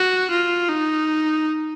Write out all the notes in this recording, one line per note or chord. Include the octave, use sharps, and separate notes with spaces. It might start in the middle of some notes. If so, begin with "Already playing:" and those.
Already playing: F#4
F4
D#4